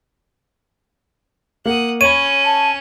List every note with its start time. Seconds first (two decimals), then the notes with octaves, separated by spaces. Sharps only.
1.66 A#3 F#5 D#6
2.01 C#4 C#5 B5 D#7
2.45 A5